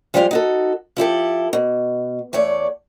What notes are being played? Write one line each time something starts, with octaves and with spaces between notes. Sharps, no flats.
F3 G3 G#3 E4 G4 F5
D#4 F#4 A4
F3 E4 G4 A4
B2
E2 A3 C#5 D5